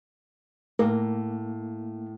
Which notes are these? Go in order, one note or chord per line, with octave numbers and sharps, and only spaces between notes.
A2 A#3 A#4